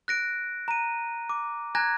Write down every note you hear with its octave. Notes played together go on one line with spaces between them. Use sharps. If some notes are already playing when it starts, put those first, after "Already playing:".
F#6 A#6 D7
A#5 D#7
D6
G#5 A#5 F#6 G#6 A#6